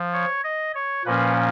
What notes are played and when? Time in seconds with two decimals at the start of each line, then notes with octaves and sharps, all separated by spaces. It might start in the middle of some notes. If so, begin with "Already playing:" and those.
Already playing: F3
0.13 C#5
0.44 D#5
0.75 C#5
1.05 A#2 F3 A#3 C#4 B4